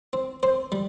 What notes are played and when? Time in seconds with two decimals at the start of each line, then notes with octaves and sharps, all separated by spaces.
0.13 C4
0.43 C4 C5
0.72 G3